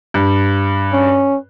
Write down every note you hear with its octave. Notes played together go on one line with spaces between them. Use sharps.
G2
C#4